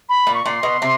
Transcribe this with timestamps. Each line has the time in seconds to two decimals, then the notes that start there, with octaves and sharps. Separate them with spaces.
0.09 B5
0.27 A#2
0.34 C#6
0.45 A#2 C6
0.63 B2
0.82 C3